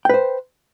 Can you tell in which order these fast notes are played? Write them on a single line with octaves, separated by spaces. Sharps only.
G5 B4 C5